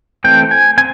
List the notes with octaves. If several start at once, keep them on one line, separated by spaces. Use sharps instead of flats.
E3 A3 C4 G5
G#5
C4 G#5